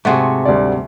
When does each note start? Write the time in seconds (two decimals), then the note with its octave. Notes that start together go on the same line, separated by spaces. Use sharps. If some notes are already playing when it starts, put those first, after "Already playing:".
0.05 G#2 C3 A3 F#4 G#4
0.45 D2 G3 D5